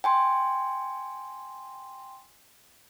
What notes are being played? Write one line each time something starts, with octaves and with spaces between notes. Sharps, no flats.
G5 G#5 C6